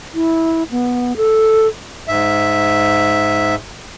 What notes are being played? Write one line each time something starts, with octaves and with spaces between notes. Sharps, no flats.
E4
B3
A4
G#2 E5